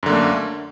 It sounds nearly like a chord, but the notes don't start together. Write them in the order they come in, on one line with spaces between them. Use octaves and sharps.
F#2 D3 A#3 A3